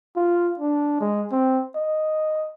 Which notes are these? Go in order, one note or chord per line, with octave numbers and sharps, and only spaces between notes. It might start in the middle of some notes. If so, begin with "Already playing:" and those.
F4
D4
G#3
C4
D#5